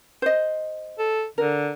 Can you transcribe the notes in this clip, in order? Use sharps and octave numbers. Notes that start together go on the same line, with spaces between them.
C5 D#5
A4
D3 A#4